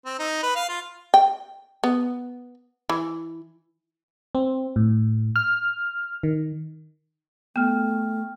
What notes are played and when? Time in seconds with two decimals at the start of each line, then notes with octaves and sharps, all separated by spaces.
0.06 C4
0.19 D#4
0.43 B4
0.56 F5
0.69 F4
1.14 G5
1.84 B3
2.89 E3
4.35 C4
4.76 A2
5.36 F6
6.23 D#3
7.56 A3 B3 G5 F6